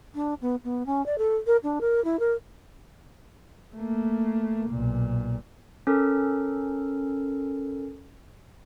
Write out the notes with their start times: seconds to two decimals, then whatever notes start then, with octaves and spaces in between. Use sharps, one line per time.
0.15 D4
0.41 B3
0.64 B3
0.86 C#4
1.06 D5
1.18 A4
1.47 A#4
1.63 D4
1.81 A#4
2.04 E4
2.19 A#4
3.75 A3 A#3
4.70 B1 A#2
5.87 C#4 A4 A#4